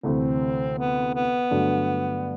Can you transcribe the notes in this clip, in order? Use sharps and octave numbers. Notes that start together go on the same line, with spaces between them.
D2 C3 E3 A3 C4
B3
B3
G2 D3 F#3 A3